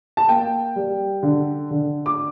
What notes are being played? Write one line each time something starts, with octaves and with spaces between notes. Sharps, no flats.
A5
A#3 G5
G3
D3
D3
D6